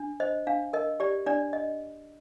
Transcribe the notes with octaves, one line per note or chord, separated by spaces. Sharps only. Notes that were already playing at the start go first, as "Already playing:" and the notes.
Already playing: D4
C5 D#5
D4 F5
A#4 D#5
G4 D5
D4 D5
D#5